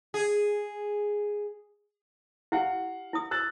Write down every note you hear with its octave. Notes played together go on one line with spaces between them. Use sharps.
G#4
E4 G4 F5 F#5
E4 D#6
E6 F#6 A6